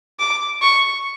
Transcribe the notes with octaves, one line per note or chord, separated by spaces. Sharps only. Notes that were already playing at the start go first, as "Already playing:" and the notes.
D6
C#6